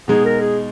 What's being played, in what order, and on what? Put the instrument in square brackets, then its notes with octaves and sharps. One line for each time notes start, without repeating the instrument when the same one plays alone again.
[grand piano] B2 G#3 D#4 [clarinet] G#4
[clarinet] A#4
G#4